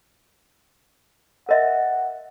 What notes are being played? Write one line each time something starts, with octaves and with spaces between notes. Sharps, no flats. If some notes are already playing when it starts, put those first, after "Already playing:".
A#4 D#5 E5 F#5